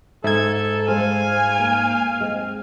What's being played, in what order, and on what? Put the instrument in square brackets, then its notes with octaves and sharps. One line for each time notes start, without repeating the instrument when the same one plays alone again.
[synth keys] G#2 G#6 [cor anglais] A4 [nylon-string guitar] E5
[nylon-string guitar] G#3 C5 [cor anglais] F5 [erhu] G#5
[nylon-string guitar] A#3
G#3 C4